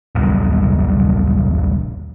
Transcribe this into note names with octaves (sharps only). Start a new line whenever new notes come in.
D#1 B1 G2